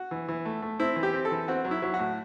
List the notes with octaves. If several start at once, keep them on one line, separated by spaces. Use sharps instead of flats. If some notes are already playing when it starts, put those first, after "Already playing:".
Already playing: F#4
E3
E3
A3
A3
C4 E4
E3
G4
C4
A4
E3
C4 F#4
F#3
E4
F#3
F#4
A2